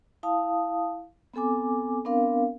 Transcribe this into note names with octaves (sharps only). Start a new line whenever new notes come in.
E4 F5 A5 D#6
B3 C4 A4 G#5 D6
B3 C4 D4 A#4 F5